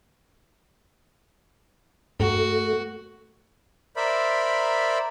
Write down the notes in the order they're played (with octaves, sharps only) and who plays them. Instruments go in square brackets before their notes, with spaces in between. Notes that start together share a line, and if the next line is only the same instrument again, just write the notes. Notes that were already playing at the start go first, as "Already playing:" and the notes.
[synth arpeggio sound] G2 [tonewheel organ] A3 [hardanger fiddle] F#4
[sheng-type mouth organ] A#4 C5 D5 E5 B5